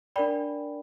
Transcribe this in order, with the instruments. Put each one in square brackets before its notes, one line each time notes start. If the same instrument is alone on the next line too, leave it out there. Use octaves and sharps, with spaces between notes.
[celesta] D4 A#4 D5 G5 B5